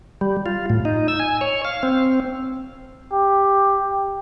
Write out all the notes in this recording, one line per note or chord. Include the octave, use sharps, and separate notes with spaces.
G3
F4
A2
D#4
E6
G#5
C#5
F5
C4
G4